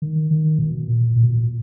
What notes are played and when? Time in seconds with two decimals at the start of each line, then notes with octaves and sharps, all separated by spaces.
0.02 D#3
0.31 D#3
0.59 B2
0.88 A#2
1.16 A#2
1.23 B2
1.30 A#2